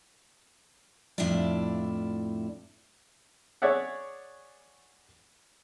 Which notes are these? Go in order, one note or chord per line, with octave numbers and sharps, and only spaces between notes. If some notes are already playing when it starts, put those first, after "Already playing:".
F2 A2 D4 E4 F4 D5
G#4 C#5 D5 E5 F#5